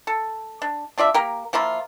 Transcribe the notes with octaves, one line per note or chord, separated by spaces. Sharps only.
A4
D4
D4 F4 D5 E5
A#3 G4 A#4
F3 A#3 E4 F4